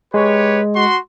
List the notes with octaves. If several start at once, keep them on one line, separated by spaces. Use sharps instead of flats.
G#3 G4 B4 C#5
F#4 C6